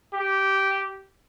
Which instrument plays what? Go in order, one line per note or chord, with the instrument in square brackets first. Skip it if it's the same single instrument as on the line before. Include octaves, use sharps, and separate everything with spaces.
[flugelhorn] G4